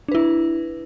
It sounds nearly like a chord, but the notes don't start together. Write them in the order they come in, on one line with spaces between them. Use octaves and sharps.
D4 B4 E4